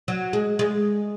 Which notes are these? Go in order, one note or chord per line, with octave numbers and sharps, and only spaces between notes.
F#3
G#3
G#3